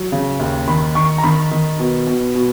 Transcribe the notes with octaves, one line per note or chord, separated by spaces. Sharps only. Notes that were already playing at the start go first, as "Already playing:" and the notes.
Already playing: F#3
C#3
D#2
D#3 B5
D#3 C#6
A#5
D#3 B5
D#3
B2
B2
B2